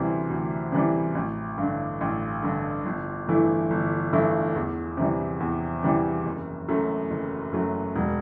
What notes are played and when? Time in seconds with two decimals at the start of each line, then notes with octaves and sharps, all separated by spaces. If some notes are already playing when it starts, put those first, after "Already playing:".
Already playing: D2 C3 E3 G3
0.30 D2
0.72 C3 E3 G3
1.15 A1
1.58 G2 D3
2.01 A1
2.43 G2 D3
2.85 G1
3.28 G2 E3 A3 E4
3.70 G1
4.13 G2 E3 A3 E4
4.56 E2
4.97 C3 E3 G3
5.40 E2
5.83 C3 E3 G3
6.26 F#1
6.68 F#2 F#3 A3
7.10 F#1
7.52 F#2 F#3 A3
7.95 E1